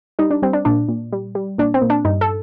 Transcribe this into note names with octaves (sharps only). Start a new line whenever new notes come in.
G3 D#4
D4
G3 C4
D4
A#2 D4
A#2
G3
G3
A#2 D4
C4
A#2
D4
G2 D#4
A4